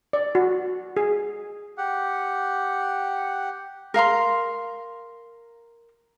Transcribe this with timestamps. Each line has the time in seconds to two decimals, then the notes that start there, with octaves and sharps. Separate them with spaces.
0.13 D5
0.35 F#4
0.97 G#4
1.78 G4 F#5
3.94 A#4 F5 A#5 C6